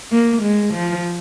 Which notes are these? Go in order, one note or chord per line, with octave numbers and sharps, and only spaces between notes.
A#3
G#3
F3